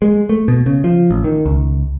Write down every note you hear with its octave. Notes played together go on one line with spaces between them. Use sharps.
G#3
A3
B2
C#3
F3
A1
D#3
C#2